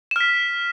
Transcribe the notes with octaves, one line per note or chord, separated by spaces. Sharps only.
F6 B6 E7